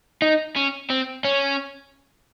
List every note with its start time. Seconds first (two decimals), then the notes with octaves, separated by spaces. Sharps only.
0.22 D#4
0.56 C#4
0.90 C4
1.25 C#4